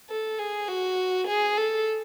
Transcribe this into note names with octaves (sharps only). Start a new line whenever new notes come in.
A4
G#4
F#4
G#4
A4